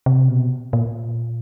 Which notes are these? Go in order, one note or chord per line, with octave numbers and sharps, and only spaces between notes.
C3
B2
A#2